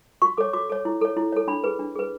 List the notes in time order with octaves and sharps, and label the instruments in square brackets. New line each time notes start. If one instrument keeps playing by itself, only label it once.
[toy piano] F#4 C#6
A4 C#5 D6
F#4 D6
A4 C#5
E4
A4 C#5
E4
A4 C#5
D4 B5
G#4 B4
D4
G#4 B4